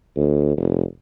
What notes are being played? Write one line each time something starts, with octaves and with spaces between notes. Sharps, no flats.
D2
F1